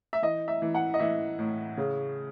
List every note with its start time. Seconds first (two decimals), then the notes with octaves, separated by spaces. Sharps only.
0.13 E5
0.22 E3 D#5
0.48 E5
0.62 E3
0.75 F#5
0.94 D#5
0.99 E3 E5
1.39 A2
1.77 C#3